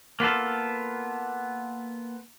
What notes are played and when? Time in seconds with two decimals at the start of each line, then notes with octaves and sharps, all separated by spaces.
0.20 A#3 B3 F4 A4